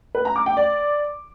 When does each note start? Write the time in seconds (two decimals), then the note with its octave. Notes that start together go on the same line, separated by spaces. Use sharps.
0.15 B4
0.25 A#5
0.36 D6
0.46 G5
0.57 D5